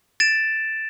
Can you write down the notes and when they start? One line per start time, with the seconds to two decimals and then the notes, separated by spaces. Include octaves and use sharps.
0.20 A6 D7 E7